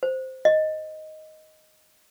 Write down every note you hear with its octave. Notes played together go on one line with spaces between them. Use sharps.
C5
D#5